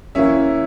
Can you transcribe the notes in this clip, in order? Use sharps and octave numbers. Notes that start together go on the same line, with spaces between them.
E3 A#3 C#4 E5